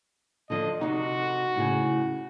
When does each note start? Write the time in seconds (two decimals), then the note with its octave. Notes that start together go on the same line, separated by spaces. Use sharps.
0.50 D3 F3 D4 D#5
0.81 C3 D#4 F#4
1.56 A2 C#3